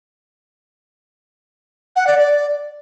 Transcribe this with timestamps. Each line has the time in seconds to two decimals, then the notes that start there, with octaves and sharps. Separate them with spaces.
1.96 F#5
2.07 D5
2.18 D5